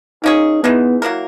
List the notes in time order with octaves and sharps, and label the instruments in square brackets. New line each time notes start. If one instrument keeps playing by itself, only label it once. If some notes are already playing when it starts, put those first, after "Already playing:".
[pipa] A#3 C#4 G#4 [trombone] D#4
[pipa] E3 G#3 D#4 [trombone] B3
[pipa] F#3 A#3 E4 A#4